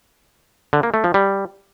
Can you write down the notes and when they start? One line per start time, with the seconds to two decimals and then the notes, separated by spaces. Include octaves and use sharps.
0.73 D3
0.83 A#3
0.94 A3
1.04 F3
1.14 G3